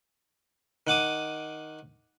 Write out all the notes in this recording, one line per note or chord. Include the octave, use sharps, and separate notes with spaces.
D#3 F#5 D6 D#6